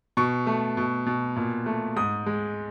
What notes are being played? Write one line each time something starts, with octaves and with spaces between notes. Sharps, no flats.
B2 C#6
A3
B2
B2
A#2
A3
G#2 D#6
G#3